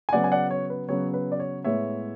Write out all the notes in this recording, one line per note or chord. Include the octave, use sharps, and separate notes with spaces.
G#5
C#3 F#3 B3 D5 F#5
G#5
D5 F#5
C#5
B4
C#3 F#3 B3 C#5
B4
D5
C#5
A2 G#3 B3 C#5 E5